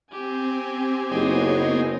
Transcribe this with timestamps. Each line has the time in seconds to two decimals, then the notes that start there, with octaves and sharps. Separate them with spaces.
0.12 C4 G4 G#5
1.11 F#1 B3 C4 D#4 G#4 C#5 D#5